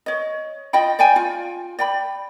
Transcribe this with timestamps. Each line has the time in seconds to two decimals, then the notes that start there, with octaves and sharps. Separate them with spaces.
0.06 C#5 D#5
0.73 F4 D#5 G5 B5
0.99 D5 G5 G#5
1.16 F4
1.79 D5 G5 B5